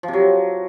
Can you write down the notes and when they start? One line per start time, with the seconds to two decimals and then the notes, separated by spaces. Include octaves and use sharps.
0.03 F3
0.08 C3
0.13 F#3